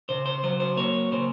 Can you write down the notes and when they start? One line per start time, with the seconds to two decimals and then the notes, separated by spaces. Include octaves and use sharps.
0.09 C#3 C5
0.26 C5
0.43 F#3 C5
0.60 C5
0.77 A#3 C#5
1.12 C#3 C5